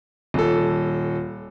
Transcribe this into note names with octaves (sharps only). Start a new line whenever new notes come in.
D#1 A4